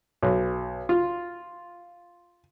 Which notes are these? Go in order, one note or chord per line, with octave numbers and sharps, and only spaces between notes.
B1
F4